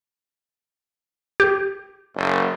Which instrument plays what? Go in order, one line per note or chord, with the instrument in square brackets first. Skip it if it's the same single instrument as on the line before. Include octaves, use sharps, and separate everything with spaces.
[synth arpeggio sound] G4
[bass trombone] F#1